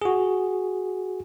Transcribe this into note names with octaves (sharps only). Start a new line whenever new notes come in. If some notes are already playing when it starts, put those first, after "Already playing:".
F#4 G#4